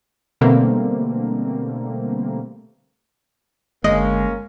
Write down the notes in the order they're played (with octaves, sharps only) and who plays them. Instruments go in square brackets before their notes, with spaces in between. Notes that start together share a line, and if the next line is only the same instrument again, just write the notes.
[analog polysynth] B2 D3 G3 A3 A#3 C4
[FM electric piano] G1 D3 A#6 [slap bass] G#3 [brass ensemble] A#3 C#4 [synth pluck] D#5